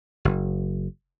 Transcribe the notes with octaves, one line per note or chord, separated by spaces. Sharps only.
F#1